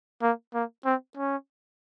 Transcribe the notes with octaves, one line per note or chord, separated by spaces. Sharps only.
A#3
A#3
C4
C#4